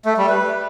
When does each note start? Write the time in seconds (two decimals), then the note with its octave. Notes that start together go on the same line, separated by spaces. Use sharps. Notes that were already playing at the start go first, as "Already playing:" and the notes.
0.05 A3
0.17 G3
0.29 B4